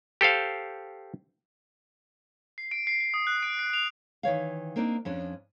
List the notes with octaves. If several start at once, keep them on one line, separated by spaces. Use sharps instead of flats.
G4 A4 C5 F5
C7
D7
C7
C7
D#6
F#6
D7
C7
F7
D#3 E3 C#5 F5
A#3 C4 D4 D#4
F2 C#4 D4